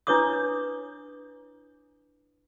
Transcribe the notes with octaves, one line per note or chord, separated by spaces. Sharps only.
D4 E4 B4 C#5 D6 D#6